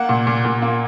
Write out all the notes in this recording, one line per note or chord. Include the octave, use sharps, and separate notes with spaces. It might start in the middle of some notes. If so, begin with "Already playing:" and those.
Already playing: A#3 F#5
A#2
A#2
A#2
A#3